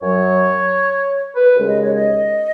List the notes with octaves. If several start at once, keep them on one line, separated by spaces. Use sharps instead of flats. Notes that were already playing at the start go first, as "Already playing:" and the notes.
F#2 F#3 C#5
B4
D#2 C#3 G#3
D#5
C#5
D#5